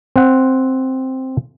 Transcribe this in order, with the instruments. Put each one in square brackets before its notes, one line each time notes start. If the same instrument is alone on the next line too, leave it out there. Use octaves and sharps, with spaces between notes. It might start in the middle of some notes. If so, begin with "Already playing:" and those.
[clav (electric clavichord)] C4 F#5